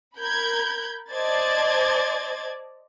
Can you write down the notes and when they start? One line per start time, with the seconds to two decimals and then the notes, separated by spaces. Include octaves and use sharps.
0.17 A#4 B5 G6 G#6
1.11 C5 D5 D#5 A5 G#6 A6